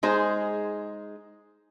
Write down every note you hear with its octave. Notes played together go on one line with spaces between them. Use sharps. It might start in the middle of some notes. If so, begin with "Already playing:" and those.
G#3 D#4 G#4 C5